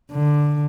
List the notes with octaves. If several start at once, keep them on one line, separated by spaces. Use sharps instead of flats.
D3